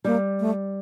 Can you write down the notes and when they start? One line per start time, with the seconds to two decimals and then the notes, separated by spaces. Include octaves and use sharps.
0.04 G3 A#3
0.40 A3